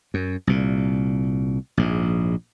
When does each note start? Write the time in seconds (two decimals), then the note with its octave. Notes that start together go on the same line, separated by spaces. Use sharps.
0.14 F#2
0.47 C2 A#2
1.77 A#1 G#2